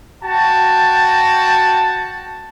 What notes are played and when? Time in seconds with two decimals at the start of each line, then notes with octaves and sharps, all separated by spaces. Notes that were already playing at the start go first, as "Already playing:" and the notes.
0.23 F#4 G5 A5